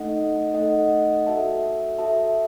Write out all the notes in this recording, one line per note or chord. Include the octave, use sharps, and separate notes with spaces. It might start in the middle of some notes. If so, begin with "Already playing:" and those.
Already playing: A3 D#4 A4 D#5 F#5
A3 D#4 A4 D#5 F#5
F#4 A4 E5 A5
F#4 A4 E5 A5